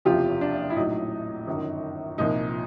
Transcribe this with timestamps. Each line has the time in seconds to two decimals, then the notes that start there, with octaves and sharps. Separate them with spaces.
0.05 F#1 E2 C3 F3 F4 G4
0.41 D4
0.70 E4
0.76 A#1 A2 F#3 D#4
1.47 G1 F#2 D#3
2.18 C2 A#2 F3 D#4